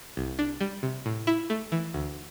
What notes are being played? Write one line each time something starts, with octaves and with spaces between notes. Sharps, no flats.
C2
D4
G3
C3
A2
E4
A3
E3
D2